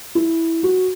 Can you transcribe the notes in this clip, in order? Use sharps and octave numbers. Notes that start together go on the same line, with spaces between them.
E4
F#4